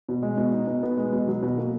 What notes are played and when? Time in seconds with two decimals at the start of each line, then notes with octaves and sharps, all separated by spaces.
0.09 B2
0.23 G#3
0.37 B2
0.52 D#4
0.67 B2
0.83 B3
0.97 G#3
1.12 B2
1.27 F#3
1.42 B2
1.57 A#3